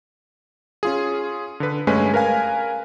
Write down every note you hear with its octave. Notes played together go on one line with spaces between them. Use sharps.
C#4 F4 G#4
D3 B4
G2 G#3 A3 C#4 B4 G#5
A#4 B4 F5 G#5